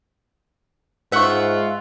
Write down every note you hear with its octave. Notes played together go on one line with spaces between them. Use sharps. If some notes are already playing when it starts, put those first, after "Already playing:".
G#2 F4 C#5 E5 F#5 C#6